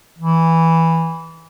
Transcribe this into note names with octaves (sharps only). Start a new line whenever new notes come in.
E3